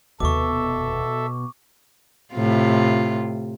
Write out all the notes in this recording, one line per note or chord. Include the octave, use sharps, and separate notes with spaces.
F1 D#2 B2 A4 E5 C#6 D6
A2 C3 F4